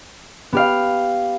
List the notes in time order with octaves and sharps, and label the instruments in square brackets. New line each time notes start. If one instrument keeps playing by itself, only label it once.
[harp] B3 G4 F5